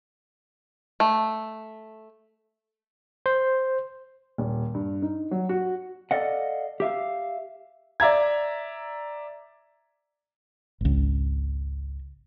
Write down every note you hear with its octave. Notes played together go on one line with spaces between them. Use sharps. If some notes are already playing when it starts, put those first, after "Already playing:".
A3
C5
D#1
G2
D#4
F#3
F#4
A4 D5 D#5 F5 F#5
G4 E5 F5
D5 E5 A#5 G#6
G#1 C#2